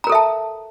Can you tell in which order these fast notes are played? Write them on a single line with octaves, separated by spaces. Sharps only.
A#5 A#4 A4 E5 A5